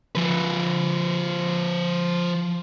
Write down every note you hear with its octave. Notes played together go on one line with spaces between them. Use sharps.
F3 B4